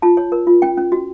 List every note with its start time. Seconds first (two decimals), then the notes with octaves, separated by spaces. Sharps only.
0.02 F4 A5
0.17 C#5
0.32 A#4
0.47 F4
0.62 C#4 G5
0.77 C#4
0.92 F#4